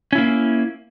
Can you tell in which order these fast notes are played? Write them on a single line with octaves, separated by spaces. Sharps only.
C#4 E4 A#3